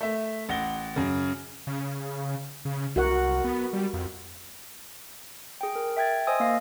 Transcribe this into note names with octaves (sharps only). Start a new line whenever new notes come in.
A3 E5
A1 F#5 A#6 G7
F#2 C#3
C#3
C#3
C2 F#4 A#4 F#5
B3
G3
F2
G#4 G5
A#4
E5 G5 G#6 A6
C5 D#5 G#5 D#6 E6
A#3 F5 A#6